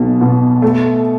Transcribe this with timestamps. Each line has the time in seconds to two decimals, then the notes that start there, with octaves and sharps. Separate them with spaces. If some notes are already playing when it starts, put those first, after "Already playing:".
Already playing: B1 B2
0.21 B2
0.62 A3